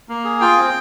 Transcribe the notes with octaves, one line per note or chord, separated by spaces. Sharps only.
A#3
G#4
F4 G5
C4